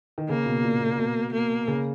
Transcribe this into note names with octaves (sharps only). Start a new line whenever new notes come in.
D#3
C#3 A#3
B2
A#2
B2
B2
A#3
C#3